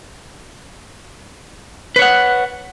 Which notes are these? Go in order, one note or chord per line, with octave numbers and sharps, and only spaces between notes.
B4 C#5 F#5